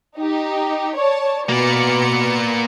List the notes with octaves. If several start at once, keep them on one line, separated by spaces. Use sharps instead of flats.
D#4 G4
C#5 D5 A5
B2 A#3 B3 D5 C#7